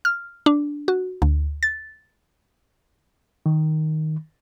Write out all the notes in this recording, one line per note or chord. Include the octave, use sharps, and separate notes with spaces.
F6
D4
F#4
D2
A6
D#3